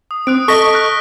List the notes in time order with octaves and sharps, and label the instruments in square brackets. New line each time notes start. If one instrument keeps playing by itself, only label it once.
[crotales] D#6
[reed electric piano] C4 [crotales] D#6 F#6 D7
[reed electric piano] A4 D#5 [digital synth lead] C#6 [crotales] A#6 B6 G7
[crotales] F6 F#6 A#6